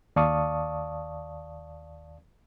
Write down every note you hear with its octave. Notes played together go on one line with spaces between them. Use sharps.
D#2 D5 F5 A5 C#6 D#6